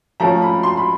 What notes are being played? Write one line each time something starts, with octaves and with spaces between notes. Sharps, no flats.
F3 A3 C#4 A#5
B5
C6
B5